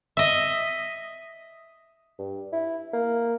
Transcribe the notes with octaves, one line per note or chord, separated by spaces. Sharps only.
D#5 E5
G2
E4
A#3